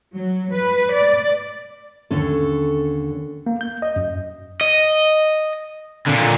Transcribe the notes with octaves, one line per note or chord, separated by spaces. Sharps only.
F#3
B4
D5
D#2 D3 C#4 A4
A#3
G6
D#5
F#2
D#5
A#2 D3